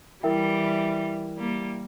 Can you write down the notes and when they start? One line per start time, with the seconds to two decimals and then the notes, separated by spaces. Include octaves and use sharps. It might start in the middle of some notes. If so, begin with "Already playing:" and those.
0.23 E3 G3 E4 A#4 E5 G5
1.37 G3 A#3